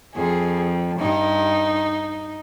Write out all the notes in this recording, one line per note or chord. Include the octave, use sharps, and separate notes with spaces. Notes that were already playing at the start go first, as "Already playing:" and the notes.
F2 G#4
G2 D#4